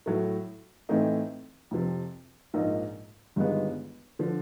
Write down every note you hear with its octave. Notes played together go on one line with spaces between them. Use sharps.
A2 F#3 A3
A2 E3 A3 C4 D#4
F2 C3 F3
A#1 G#2 F3 A#3 D#4
G1 G2 D#3 G#3 B3
D3 F3